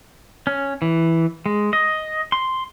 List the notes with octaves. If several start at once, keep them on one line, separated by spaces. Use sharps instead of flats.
C#4
E3
G#3
D#5
C6